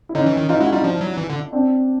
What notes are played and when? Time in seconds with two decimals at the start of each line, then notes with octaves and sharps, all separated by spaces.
0.09 E4
0.14 D3 C#4 D#4
0.26 E3
0.37 D#3
0.49 E3 D#4 F4
0.60 G#3 E4 F#4
0.72 G3 D#4 F4
0.83 F3 D4 E4
1.01 F#3
1.18 E3
1.30 D3
1.52 C4 D4